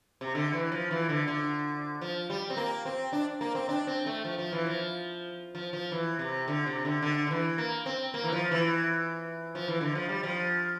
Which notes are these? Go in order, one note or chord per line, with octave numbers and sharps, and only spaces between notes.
C3
D3
E3
F3
E3
D3
D3
F3
G3
C4
A#3
C4
D4
A#3
C4
D4
C4
A3
F3
F3
E3
F3
F3
F3
E3
C3
D3
C3
D3
D3
D3
E3
A#3
C4
A#3
E3
F3
E3
F3
E3
D3
F3
G3
F3